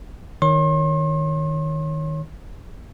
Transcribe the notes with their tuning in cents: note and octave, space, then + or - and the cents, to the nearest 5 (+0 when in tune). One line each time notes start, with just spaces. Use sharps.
D#3 +0 C#5 +0 C6 +40